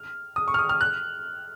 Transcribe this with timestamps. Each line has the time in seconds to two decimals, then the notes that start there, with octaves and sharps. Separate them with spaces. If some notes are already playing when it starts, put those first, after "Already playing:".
Already playing: F6
0.36 D#6
0.48 C#6
0.54 F6
0.59 D#6
0.69 F6
0.81 F#6